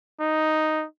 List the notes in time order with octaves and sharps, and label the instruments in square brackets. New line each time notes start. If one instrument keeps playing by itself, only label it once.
[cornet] D#4